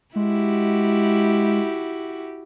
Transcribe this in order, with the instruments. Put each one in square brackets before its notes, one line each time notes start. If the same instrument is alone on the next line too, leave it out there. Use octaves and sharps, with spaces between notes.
[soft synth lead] G#3 [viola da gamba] E4 F#4 G4